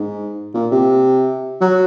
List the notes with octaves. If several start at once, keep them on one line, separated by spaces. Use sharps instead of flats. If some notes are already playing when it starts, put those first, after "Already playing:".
Already playing: G#2
A#2
C3
F#3